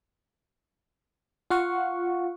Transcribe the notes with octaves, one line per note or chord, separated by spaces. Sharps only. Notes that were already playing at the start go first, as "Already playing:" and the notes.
F4 F5 F#5 C#6